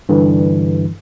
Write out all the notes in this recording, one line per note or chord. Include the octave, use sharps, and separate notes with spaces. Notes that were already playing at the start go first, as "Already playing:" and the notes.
G2 D3 E3